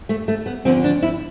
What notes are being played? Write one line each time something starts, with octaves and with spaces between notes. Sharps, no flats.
A3
A3
B3
D2 D3 F3 C4
D4
E4